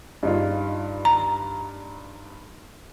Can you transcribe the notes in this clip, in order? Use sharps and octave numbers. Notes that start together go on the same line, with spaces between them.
G2 D#4 F4
A#5